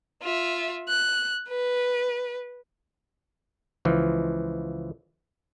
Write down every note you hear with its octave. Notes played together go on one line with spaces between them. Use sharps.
F4 E5
F#6
B4
C#2 E3 F3